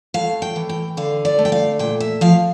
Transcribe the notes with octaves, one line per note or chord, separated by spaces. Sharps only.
A2 F5
G5
E3
G5
D3 F5
D5
A3
G5
F5
A#2 G5
E5
F3 F5